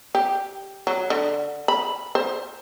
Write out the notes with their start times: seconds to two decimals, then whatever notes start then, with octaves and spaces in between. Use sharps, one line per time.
0.15 G4
0.87 F#3
1.10 D3
1.68 B5
2.15 C5